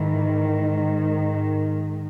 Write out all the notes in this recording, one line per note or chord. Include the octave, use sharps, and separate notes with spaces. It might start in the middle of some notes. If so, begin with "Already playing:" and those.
Already playing: G#2 D#3 E3